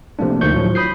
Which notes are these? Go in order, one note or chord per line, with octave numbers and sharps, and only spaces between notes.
C3 F3 A3 A#3 D4
D2 D#3 F3 C#6 G6
A2 F3 F#3
B5 D#6 G6 C7